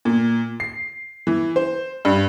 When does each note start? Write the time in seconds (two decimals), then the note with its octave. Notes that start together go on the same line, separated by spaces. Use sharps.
0.05 A#2
0.60 C7
1.27 E3
1.56 C5
2.05 G2